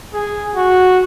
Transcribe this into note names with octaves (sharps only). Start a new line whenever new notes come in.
G#4
F#4